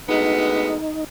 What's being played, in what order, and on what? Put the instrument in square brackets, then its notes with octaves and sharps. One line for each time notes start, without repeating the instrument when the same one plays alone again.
[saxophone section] D2 G#3 B3 [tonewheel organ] D#4